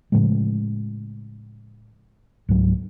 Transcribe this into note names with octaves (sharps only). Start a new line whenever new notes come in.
A2 C#3 F3 G#3
C#2 G#2 F#3